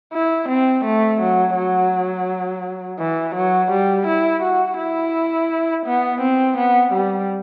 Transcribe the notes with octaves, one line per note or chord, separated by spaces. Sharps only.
E4
C4
A3
F#3
F#3
E3
F#3
G3
E4
F#4
E4
B3
C4
B3
G3